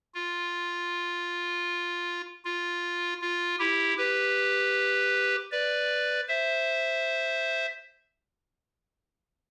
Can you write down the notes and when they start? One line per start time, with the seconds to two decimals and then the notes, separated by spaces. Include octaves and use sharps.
0.14 F4
2.45 F4
3.21 F4
3.59 E4 G4
3.98 G4 B4
5.52 B4 D5
6.28 C5 E5